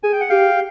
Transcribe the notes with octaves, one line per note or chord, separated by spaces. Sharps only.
G#4 G#5
G5
F#5
G4 F5 G5